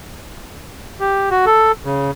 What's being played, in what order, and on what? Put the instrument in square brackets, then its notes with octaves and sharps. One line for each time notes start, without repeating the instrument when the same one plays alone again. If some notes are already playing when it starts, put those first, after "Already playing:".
[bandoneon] G4
F#4
A4
C#3